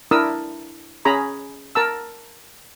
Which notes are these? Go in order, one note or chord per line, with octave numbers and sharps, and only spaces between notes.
D4 E4 A#4 D#6 E6
C#4 G#4 A#5 B5
A#4 A5 E6